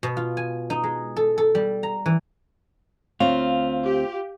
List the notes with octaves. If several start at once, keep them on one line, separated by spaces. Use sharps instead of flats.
B2
F4
G#5
D#4
G#3
A4
A4
G3
A#5
E3
D2 C4 F4 C#5 F5
G4